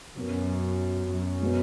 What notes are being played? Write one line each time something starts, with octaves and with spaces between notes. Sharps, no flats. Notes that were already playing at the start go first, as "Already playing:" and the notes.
F#2 B2 F#3 B3 F#4 A#4
F#2
B2 G#3 B3